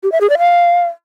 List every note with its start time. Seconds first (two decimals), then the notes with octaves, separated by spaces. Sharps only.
0.03 G4
0.12 E5
0.21 G#4
0.30 D5
0.39 F5